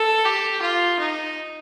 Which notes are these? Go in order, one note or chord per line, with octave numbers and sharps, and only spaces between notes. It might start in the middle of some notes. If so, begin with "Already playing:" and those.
Already playing: A4
G4
F4
D#4